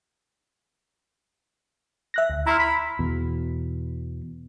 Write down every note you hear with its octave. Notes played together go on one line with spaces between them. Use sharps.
E5 F#6 A#6
D2
E4 A#5 C6 F6
B5
E2 B2